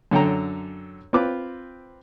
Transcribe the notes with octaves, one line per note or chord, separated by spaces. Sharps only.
F#2 D3 A4 G5 A#5
C4 F4 B4 D6